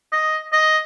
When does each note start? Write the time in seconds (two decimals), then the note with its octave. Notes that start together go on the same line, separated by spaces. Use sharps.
0.12 D#5
0.53 D#5